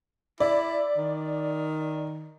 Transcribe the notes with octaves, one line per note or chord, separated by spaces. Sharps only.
E4 D5
D#3